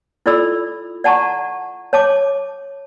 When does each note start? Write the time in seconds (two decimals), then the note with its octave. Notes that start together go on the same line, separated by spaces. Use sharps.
0.26 E4 F4 A4 D5 B5 E6
1.04 D5 F#5 A5 A#5 C#6
1.93 C#5 A5 D6